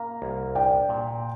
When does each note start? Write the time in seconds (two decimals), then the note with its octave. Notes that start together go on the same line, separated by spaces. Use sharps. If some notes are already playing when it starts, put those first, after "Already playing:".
Already playing: A#3 F5 A#5
0.22 C2
0.55 D4 D5 G5
0.89 A#2